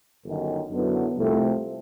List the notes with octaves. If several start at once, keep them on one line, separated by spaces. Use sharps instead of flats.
G1 F#2 D#3
F#2 D3 F#3 B3 E4
C2 C3 F3 A3